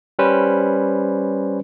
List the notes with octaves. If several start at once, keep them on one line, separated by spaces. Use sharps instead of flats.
G3 C#4 B4 C5